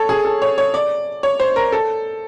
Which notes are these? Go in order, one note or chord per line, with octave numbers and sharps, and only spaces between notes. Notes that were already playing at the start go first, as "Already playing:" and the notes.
Already playing: A4 C#5
G#4
A4
C#5
C#5
D5
C#5
C5
A#4
A4